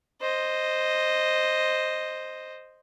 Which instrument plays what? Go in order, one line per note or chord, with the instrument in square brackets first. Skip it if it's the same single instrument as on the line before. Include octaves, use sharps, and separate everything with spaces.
[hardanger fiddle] C5 D#5